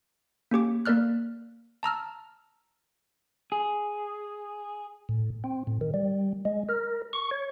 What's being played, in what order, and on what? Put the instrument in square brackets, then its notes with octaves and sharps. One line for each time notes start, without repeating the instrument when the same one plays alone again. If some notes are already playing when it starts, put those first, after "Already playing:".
[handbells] A#3 C#4 G4 D6
A#3 A#4 D5 F6 F#6
A5 A#5 E6 F6
[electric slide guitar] G#4
[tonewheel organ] A2
C4
A2
D#3
G3
G#3
A#4
C#6
C#5